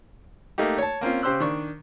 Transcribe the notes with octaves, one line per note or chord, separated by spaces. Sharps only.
A3 A#3 D#4 G4
C#5 A5
A#3 C4 C#4 F4
C#3 G4 C5 C6 E6 F#6
D#3 D4 C#6